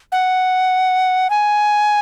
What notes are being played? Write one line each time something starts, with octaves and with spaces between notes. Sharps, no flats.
F#5
G#5